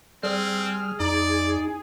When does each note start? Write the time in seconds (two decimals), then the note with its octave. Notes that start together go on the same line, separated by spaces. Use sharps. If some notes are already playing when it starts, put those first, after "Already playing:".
0.23 G3 C4 G#4 F6
1.00 F2 D#4 D5